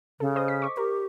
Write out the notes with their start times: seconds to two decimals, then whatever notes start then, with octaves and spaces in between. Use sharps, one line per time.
0.20 C#3 A4
0.36 C5 D#5 D#6
0.48 B6
0.62 C#6 D6
0.77 G4 A#4